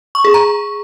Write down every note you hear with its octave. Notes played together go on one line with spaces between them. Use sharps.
C#6
G#4
A#5